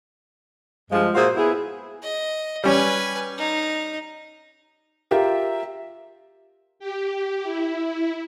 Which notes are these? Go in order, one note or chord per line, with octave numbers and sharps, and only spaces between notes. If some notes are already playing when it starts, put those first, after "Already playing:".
G2 F3 G#3
A#2 F4 F#4 G#4 C5 E5
B3 E4 G#4
D#5
G3 C#4 B4 G#5
D#4
F4 G4 A#4 E5
G4
E4